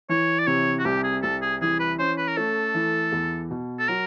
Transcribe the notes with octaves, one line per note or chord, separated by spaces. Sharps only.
E3 C#5
D5
C3 C#5
F#4
C2 G4
G#4
C2 A4
G#4
E3 G#4
B4
C#4 C5
B4
A#4
A3 A4
E3
E2
B2
A4
F#3 A#4